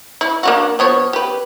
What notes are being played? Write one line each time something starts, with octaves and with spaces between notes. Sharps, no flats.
E4
A#3 D4 F#4
F3 B3 C#5
G4 B4